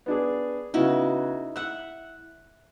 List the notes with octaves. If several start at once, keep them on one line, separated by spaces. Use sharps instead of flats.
B3 D4 G#4
C#3 B3 D#4 E4 F#4
E5 F#5 F#6